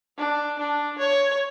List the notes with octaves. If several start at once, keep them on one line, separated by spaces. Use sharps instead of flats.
D4
D4
C#5